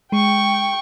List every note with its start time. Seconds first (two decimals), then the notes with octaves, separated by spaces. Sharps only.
0.12 G#3 G5 C#6